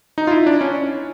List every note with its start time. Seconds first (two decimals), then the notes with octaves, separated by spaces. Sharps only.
0.18 D#4
0.27 F4
0.31 E4
0.46 D4
0.61 C#4